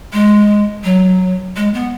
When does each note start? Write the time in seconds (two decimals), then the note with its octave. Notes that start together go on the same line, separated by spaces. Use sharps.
0.13 G#3
0.84 F#3
1.57 G#3
1.74 B3